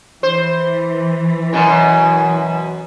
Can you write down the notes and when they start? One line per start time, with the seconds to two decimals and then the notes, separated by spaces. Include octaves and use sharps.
0.23 E3 C5
1.53 F#2 B2 G#5